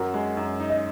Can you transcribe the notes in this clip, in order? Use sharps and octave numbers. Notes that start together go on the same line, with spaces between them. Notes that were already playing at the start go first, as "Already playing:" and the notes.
Already playing: F#2 F#4 A#4
G#3
F#2
D#4
D#5